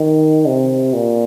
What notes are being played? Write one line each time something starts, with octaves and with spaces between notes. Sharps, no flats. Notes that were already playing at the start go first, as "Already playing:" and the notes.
Already playing: D#3
C3
A#2